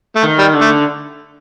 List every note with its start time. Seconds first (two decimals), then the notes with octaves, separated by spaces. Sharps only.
0.16 A3
0.23 D#3
0.39 G3
0.53 D3
0.61 A3